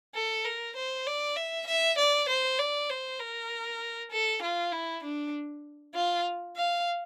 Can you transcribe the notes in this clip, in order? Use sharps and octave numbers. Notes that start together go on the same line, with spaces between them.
A4
A#4
C5
D5
E5
E5
D5
C5
D5
C5
A#4
A4
F4
E4
D4
F4
F5